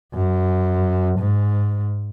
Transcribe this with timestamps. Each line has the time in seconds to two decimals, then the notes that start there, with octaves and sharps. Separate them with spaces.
0.14 F#2
1.19 G#2